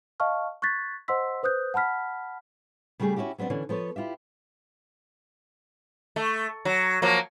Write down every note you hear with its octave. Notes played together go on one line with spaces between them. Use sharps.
D#5 F5 A5 C#6 F6
C#6 F#6 G#6 A6 B6
C5 D#5 F#5 C6 E6 B6
B4 C5 D#6 F#6 G6
F#5 A5 B5 F6 B6
C#3 G3 A3 G4 G#4
C#4 D#4 E4 F#4 G4
F#3 B3 C4 D4
D3 E3 C#4 D4
F3 B3 A4 C#5
E4 F4 G4 E5
A3
F#3
F3 F#3 A#3